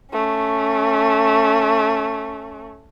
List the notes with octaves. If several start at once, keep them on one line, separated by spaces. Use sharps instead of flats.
A3 C#4